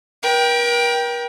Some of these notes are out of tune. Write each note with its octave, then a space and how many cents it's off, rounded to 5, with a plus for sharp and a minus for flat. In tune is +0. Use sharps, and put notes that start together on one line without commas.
A#4 +45 G5 +0